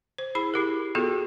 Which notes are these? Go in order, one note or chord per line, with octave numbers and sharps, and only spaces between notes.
C5
E4 G#4 B5
E4 G4 A#4
B3 F4 F#4 G#4 A4